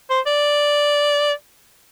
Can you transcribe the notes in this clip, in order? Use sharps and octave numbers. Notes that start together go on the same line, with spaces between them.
C5
D5